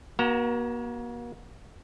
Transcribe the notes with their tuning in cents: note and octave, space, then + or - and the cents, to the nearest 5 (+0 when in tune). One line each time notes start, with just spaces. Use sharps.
A#3 +40 F#4 +15 A#5 +0